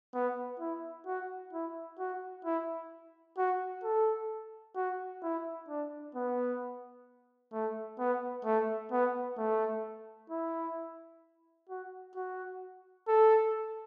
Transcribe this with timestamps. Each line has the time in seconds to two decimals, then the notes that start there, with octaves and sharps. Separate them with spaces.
0.14 B3
0.60 E4
1.06 F#4
1.53 E4
1.99 F#4
2.45 E4
3.38 F#4
3.84 A4
4.76 F#4
5.23 E4
5.69 D4
6.15 B3
7.53 A3
7.99 B3
8.45 A3
8.92 B3
9.38 A3
10.30 E4
11.69 F#4
12.15 F#4
13.08 A4